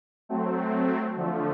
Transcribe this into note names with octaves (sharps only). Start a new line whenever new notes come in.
F#3 A3 C4
D3 F3 A3